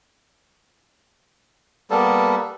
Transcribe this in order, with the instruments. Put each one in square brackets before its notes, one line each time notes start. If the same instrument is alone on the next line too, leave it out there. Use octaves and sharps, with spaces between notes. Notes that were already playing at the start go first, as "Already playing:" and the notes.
[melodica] G3 A#3 B3 A4